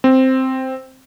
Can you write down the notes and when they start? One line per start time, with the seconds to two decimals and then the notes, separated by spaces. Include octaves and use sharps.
0.04 C4